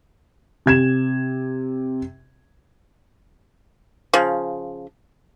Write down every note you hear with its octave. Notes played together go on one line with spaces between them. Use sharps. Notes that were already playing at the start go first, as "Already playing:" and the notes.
C3 G#6 E7
C#3 F3